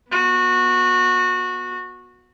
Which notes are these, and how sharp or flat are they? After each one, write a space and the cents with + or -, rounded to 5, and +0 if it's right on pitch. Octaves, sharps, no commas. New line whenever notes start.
B3 -15 F#4 -20